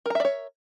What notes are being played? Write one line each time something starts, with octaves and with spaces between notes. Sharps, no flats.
A#4 C#5 D5 E5 A#5